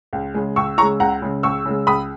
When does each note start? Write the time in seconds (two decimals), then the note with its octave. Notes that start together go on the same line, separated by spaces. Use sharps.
0.13 C#2
0.34 C#3 G#3
0.56 C#2 C#6 E6
0.78 C#3 A#5 C#6
0.83 G#3
1.00 C#2 F#5 A#5
1.22 C#3 G#3
1.43 C#2 C#6 E6
1.65 C#3 G#3
1.87 C#2 B5 D#6